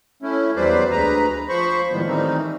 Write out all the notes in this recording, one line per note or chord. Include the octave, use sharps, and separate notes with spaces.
A3 C#4 E4
E2 F#3 G3 B4 C5 D5
D2 G#3 B4 A#5
F3 C5 B5 C#6
A2 D#3 F3 G3 G#3 B3
D#3 E3 G3 A3 C4 D#4